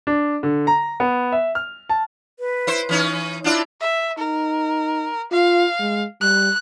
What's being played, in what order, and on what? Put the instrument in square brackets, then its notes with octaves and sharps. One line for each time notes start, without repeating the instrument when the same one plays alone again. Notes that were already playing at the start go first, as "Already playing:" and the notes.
[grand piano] D4
D3
A#5
B3
E5
F6
A5
[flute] B4
[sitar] E4 C5
E3 C#4 D#4
[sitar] D4 F4 D5 [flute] E4
[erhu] E5
[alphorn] D#4 [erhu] A#4
[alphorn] F4 [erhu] F5
[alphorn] G#3
[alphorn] G3 [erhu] F#6